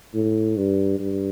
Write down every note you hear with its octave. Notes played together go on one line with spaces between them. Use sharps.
A2
G2
G2